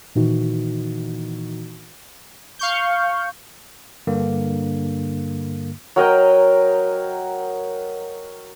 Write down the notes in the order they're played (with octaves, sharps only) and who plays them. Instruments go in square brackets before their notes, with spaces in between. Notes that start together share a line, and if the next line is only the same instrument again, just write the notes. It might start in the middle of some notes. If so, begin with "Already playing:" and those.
[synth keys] A#2 D#3 E3 D#4 F#4
[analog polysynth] F5 C#6 G6
[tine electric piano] G2 D3 A#3
[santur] F#3 A#4 D#5 G5